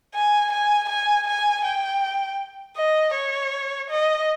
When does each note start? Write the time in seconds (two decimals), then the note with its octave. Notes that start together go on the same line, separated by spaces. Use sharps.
0.15 G#5
0.52 G#5
0.89 G#5
1.27 G#5
1.65 G5
2.77 D#5
3.14 C#5
3.90 D#5